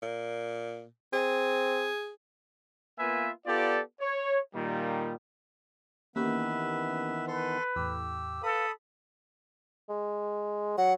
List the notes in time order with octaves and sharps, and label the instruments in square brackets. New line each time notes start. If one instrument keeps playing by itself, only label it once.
[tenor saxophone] A#2
[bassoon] C4 [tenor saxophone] G#4
[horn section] A#3 B3 F4 B4 E5 G#5
B3 F4 G4 A4 D5
C#5
A#2 D#3 G3
[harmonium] D#3 E3 B3 [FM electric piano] A#3 C#4 G4 [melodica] B4 E5
[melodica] A4 C6 [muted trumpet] B4
[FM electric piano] E2 A2 [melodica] G4 E6
[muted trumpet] A4 [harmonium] B4 F5 [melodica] B5 D#6
[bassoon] G#3
[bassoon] F#3 [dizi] F#5